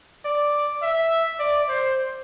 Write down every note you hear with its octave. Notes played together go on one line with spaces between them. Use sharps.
D5
E5
D5
C5